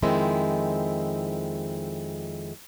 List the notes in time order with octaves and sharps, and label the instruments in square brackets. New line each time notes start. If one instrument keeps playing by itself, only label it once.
[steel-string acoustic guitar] F2 D#3 G#3 C4 E4